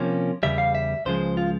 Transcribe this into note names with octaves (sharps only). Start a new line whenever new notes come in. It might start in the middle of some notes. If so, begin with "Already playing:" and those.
Already playing: C3 F3 A#3 C#4
E2 C#3 G3 E5
F5
E5
C#2 C#3 F3 G#3 C5
F4